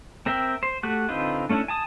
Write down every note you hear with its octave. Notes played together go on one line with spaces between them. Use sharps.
C4 A#4 E5 G5
C5
A3 F#4 G4 F#6
D3 C4 D#4 F4 B4
A3 C#4 D4 E4
G#5 A5 D#6